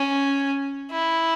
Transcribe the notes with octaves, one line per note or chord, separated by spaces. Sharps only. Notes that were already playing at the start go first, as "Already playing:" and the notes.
Already playing: C#4
E4